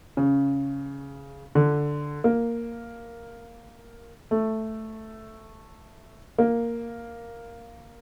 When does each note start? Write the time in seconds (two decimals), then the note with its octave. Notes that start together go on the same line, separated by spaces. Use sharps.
0.17 C#3
1.55 D3
2.24 A#3
4.31 A3
6.39 A#3